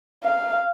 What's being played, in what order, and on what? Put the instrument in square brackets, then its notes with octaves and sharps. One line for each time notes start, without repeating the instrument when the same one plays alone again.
[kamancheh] F5